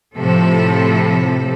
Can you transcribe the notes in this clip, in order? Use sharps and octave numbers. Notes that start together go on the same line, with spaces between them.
A2 C3 F3 A4